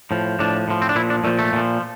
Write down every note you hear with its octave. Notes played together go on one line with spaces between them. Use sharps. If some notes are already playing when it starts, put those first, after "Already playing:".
A2 F3
A2 F3 D4
A2 F3
C4
D4
A#2 F3 E4
D4
A#2 F3 A3
A3
A#2 F3